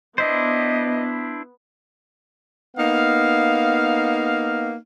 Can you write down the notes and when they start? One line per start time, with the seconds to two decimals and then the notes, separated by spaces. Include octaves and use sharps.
0.18 B3 D4 E4 C5 D#5
2.77 A#3 B3 D#4 F5